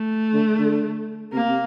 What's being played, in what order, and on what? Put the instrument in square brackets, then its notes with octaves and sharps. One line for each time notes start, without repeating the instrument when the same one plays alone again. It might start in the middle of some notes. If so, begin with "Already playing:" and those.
Already playing: [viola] A3
[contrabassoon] D3
D3
[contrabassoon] C3 [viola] A#3
[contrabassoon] C3